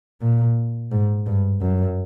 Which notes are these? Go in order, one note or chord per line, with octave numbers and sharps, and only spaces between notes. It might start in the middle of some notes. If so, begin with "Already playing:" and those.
A#2
G#2
G2
F#2